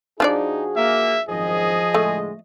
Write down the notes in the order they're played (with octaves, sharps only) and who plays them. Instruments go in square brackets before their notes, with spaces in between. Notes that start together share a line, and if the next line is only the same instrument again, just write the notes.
[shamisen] F3 D4 D5 [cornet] D#4 [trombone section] F#4 G#4
[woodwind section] A#3 [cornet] E5
[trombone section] G#1 F#2 D#3 [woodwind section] F3 D#5 [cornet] G#4
[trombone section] A2 D3 G#3 [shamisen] A3